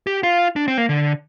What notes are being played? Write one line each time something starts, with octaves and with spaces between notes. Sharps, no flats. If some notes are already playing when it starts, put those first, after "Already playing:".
G4
F4
D4
C4
A#3
D3